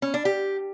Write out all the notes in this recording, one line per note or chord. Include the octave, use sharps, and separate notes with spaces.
C#4
D4
G4